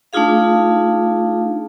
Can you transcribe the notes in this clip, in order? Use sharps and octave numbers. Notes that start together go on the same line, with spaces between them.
A3 D4 D#4 F4 G#4 F5